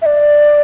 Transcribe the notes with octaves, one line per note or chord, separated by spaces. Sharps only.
E5
D5